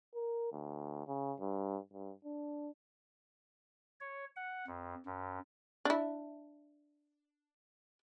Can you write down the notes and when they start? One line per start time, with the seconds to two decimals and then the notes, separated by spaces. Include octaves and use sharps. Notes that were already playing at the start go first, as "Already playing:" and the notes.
0.15 A#4
0.52 D2
1.07 C#3
1.40 G2
1.93 G2
2.25 D4
4.01 C#5
4.36 F#5
4.67 F2
5.06 F#2
5.85 D4 E4